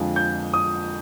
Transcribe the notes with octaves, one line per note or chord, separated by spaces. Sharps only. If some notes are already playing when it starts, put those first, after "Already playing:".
Already playing: F2 D3 F3 G#3
G6
D#6